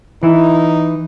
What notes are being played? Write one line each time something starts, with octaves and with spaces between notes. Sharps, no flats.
E3 D#4 E4